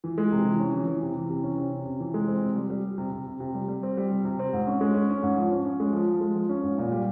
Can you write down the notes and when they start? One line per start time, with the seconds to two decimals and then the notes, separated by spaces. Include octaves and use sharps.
0.04 E3
0.18 G#3
0.32 C3
0.46 E3
0.59 C#4
0.74 E3
0.87 E3
1.02 C3
1.16 E3
1.29 C3
1.43 C#4
1.58 C3
1.72 C#4
1.86 C3
2.00 E3
2.14 G#3
2.28 C4
2.42 C3
2.56 G3
2.70 G3
2.85 G3
2.98 C3
3.12 C3
3.26 C3
3.40 C3
3.54 G3
3.68 G3
3.83 C4
3.97 G3
4.11 C3
4.25 C3
4.39 C4
4.53 G#2
4.67 C#4
4.81 G#3
4.94 C#4
5.10 C#4
5.23 G#2
5.37 F3
5.51 C#4
5.65 C#4
5.80 G#3
5.93 F3
6.08 F3
6.21 G#3
6.35 F3
6.49 C#4
6.63 G#2
6.78 A#2
6.92 G3